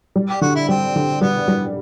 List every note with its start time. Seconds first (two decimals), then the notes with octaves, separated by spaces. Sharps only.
0.16 G3
0.29 G4
0.41 D3 F#4
0.55 E4
0.69 G3 C4
0.96 D3
1.21 G3 B3
1.48 G3